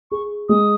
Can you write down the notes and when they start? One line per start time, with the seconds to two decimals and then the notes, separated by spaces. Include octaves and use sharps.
0.11 G#4 C#6
0.49 G#3 D#6